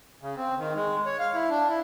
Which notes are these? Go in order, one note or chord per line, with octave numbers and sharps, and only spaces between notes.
C#3
C4
D#3
G#3
C#5
F5
E4
D4
E4